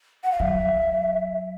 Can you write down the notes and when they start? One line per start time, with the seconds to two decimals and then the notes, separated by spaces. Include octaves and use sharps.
0.24 F#5
0.32 F5
0.40 F#3 E5